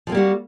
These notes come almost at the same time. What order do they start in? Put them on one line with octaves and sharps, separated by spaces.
F3 C4 A#3 G3 F#4